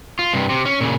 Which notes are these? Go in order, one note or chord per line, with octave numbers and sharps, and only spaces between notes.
F4
G2 C3
C3
C#4
A#2 C#3